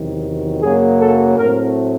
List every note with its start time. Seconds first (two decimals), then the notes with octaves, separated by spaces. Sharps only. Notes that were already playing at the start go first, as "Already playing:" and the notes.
Already playing: E2 C3 D#3 F#3
0.62 F#2 C#3 F#3 A#3 G#4
0.99 A4
1.37 A2 F#3 A3 C4 A#4